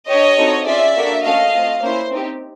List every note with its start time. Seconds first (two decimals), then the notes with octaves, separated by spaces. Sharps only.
0.09 D4 G4 C#5 D#5
0.38 C4 D#4 F#4 A4
0.67 C#4 F4 G#4 D5 E5
0.96 A#3 D4 F#4 A4
1.25 A3 C#4 F#4 A4 D#5 F5
1.54 A3 C4 F4
1.83 A#3 C#4 E4 C5
2.12 C4 D#4 G4